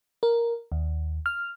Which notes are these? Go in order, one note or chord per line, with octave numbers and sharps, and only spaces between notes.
A#4
D#2
F6